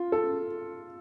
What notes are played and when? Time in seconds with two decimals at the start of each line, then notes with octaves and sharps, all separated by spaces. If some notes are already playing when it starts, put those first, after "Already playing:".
Already playing: F4
0.12 A4